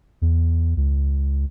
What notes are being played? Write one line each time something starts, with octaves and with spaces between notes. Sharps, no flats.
E2
C#2